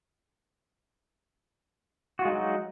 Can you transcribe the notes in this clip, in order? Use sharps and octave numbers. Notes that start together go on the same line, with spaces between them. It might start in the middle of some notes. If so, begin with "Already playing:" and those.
F#3 G#3 D#4 F4 F#4